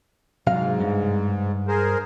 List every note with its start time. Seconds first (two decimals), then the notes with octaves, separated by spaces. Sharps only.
0.47 G#2 C3 F#3 F5
0.81 G2
1.68 G#4 A#4 C5